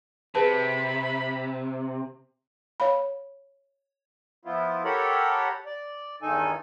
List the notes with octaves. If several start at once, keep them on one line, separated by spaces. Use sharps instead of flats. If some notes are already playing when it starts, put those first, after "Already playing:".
C3 G#4 B4 A5 B5
C#5 F5 B5
F3 B3 E4 F4
G4 A4 A#4 C#5 F#5 B5
D5
E2 G2 D#3 D#4 A4 G#5